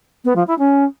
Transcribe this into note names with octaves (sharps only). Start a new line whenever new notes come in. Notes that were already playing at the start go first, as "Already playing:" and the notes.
B3
F3
E4
C#4